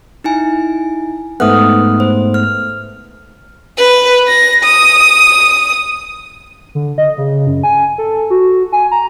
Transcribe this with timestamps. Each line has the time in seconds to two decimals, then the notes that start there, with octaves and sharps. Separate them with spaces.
0.24 D#4 E4 G#5
1.40 G#2 A3 B3 D#6 F6 F#6
2.00 C5
2.34 F6
3.78 B4
4.27 A#6
4.64 D#6
6.75 D3
6.98 D#5
7.18 C#3
7.47 F#2
7.63 G#5
7.98 A4
8.30 F#4
8.72 G#5
8.92 A#5